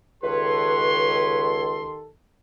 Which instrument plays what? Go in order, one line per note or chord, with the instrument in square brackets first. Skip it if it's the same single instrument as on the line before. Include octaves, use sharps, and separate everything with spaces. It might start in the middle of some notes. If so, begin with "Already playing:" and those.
[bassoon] C#2 [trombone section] D#3 G4 A4 [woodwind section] B4 C#5 [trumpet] C6